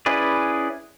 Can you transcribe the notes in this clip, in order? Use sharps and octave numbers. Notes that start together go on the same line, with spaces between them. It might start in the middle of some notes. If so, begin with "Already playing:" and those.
C#4 E4 G#4 B4 D5